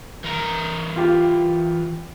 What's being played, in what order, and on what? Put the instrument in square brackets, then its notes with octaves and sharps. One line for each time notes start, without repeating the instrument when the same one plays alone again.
[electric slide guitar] E3 A#4 A#5
[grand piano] F4 G4